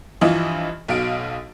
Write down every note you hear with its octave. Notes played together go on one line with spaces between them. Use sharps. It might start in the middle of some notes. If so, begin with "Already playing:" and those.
G2 E3 F3 E4 F4 D#5
B1 B2 F5 D7